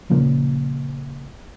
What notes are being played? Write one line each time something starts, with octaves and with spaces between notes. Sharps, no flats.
A#2 C#3 F3 A#3